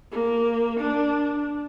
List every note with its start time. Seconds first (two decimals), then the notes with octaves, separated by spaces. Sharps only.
0.12 A#3
0.80 D4